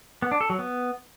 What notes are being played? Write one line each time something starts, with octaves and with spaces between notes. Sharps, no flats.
B3
D4
A4
F#3
B3